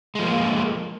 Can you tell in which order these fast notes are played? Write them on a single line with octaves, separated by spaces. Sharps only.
G#3 F3 A#3